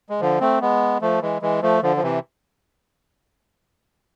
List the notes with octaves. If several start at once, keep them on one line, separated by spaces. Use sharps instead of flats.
G#3
D3 F3
A3 C4
G#3 B3
F3 A3
E3 G#3
E3 G#3
F3 A3
D3 F3
F3
C3 E3